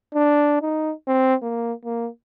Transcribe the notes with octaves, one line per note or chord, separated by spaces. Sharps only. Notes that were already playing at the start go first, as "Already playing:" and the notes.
D4
D#4
C4
A#3
A#3